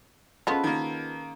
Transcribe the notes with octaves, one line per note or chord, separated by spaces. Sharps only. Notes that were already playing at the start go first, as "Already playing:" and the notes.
F3 B3 C#4 G#4 A4 B4 D#5
D#3 A#3